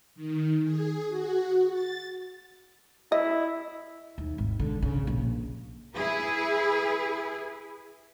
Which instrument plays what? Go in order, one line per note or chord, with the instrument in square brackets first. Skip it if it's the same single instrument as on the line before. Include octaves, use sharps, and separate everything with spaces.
[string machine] D#3
G#4
F#4
A6
[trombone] E4 [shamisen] D#5
[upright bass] D#2
G#1
D3
C#3
A#1
[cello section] E4 G#4 B4